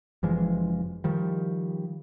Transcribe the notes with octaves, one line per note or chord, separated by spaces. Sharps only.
F#1 E3 F3 G#3
D#3 F3 G3